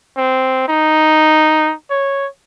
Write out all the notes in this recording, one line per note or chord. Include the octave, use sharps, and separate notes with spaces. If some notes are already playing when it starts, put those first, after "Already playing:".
C4
D#4
C#5